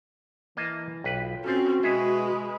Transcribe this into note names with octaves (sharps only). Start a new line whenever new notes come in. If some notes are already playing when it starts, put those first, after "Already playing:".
E3 A#3 D#5 A5
B1 F4 B4 G5
C4 C#4 F#4 A4 C5
B2 G#3 G#4 B4 E5 F#5